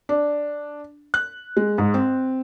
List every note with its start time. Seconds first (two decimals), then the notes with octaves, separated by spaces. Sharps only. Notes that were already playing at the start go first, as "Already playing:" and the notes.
0.09 D4
1.14 F#6
1.57 G#3
1.78 G#2
1.94 C4